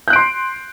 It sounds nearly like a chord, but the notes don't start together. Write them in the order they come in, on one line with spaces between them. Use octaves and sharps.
G6 F#6 D7 C6 C7